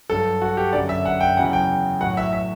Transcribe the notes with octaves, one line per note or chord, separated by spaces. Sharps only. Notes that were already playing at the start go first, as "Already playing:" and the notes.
G2 F#3 A4
F#4
G4
F#2 D3 F#3 D5
E5
F#5
G5
E2 C#3 F#3 F#5
G5
A2 F#3 F#5
E5
E5